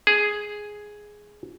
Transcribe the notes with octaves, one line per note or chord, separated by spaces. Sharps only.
G#4